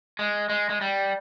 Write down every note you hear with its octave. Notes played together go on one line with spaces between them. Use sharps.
G#3
G#3
G#3
G3